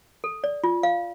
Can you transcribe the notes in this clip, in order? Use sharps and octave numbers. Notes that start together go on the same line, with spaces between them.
A4
D5
F4
F5